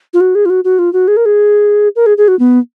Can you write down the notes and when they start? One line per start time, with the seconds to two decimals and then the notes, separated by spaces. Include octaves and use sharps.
0.14 F4
0.20 F#4
0.35 G#4
0.45 F4
0.50 F#4
0.64 F#4
0.79 F4
0.93 F#4
1.08 G#4
1.17 A#4
1.25 G#4
1.96 A#4
2.06 G#4
2.17 G#4
2.28 F#4
2.39 B3